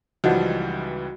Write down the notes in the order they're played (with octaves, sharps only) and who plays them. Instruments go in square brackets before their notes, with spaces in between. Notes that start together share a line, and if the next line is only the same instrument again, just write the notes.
[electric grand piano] C#2 E3 G3 [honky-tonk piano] F3 [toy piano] D#4 D#5 F#5 [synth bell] F#4